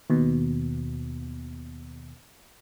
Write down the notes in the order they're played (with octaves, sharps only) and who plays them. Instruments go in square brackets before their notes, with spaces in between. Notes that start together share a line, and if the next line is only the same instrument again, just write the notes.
[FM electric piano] D#2 B2